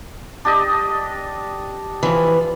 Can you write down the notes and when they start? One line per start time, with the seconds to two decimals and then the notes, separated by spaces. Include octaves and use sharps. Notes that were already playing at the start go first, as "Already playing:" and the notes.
0.45 D4 G4 D#5
2.03 E3 F3